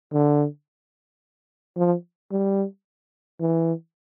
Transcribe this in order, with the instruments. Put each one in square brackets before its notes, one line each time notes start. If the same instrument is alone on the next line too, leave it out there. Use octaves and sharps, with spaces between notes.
[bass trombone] D3
F3
G3
E3